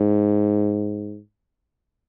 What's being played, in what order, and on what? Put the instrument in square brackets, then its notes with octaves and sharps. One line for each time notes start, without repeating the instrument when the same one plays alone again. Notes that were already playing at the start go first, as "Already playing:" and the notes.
Already playing: [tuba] G#2